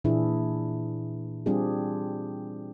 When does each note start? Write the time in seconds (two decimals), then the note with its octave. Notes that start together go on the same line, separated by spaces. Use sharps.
0.04 A#2 E3 D4 E4 G#4
1.46 G3 C4 D4 F4 G4 G#4